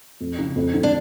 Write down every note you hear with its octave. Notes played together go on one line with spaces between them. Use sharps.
F2
C#3
F2
D3
D4